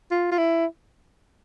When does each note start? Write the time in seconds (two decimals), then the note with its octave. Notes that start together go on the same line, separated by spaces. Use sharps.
0.11 F4
0.31 F4
0.38 E4